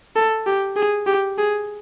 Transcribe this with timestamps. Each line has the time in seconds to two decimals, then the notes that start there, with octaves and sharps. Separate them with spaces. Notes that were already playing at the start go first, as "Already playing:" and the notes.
0.16 A4
0.46 G4
0.76 G#4
1.07 G4
1.38 G#4